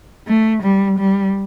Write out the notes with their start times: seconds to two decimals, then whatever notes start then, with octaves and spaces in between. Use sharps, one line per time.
0.27 A3
0.62 G3
0.99 G3